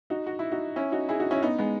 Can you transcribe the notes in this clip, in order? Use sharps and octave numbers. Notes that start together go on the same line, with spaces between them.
D#4 F#4
F#4
E4
D#4 F#4
C#4 E4
D#4 F#4
E4 G#4
D#4 F#4
C#4 E4
B3 D#4
G#3 B3